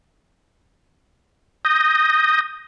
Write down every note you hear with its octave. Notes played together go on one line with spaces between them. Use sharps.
D#6 G6 A#6